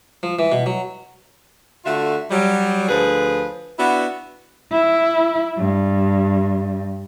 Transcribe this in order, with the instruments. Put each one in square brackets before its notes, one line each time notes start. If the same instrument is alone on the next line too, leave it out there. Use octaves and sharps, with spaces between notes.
[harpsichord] F3
E3
B2
F#3
[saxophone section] D3 A3 F4 F#4 E5
F#3 G3
D2 F3 G#4 B4
B3 D4 E4 F#4
[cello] E4
G2